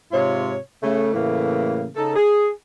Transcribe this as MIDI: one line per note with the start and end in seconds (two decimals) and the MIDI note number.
0.12 0.56 44
0.12 0.56 48
0.12 0.56 65
0.12 0.56 73
0.83 1.11 49
0.83 1.11 57
1.14 1.87 45
1.14 1.87 49
1.14 1.87 52
1.14 1.87 57
1.14 1.87 58
1.96 2.12 49
1.96 2.12 63
1.96 2.12 69
2.16 2.49 68